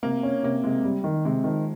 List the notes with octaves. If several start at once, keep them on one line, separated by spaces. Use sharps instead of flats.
C3 A#3
C#4
C3 A#3
C3 G#3
G3
D#3
C3 G#3
D#3 F3